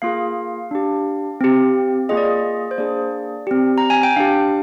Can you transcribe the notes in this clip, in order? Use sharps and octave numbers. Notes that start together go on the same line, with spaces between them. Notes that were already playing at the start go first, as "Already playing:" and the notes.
A#3 F4 G#4 F5
D4 G4
C4 G4
A#3 F4 G#4 D#5
D5
D#5
D5
C5
A#3 D4 G#4 D5
C4 G4
A#5
G#5
G5
D4 G4 F5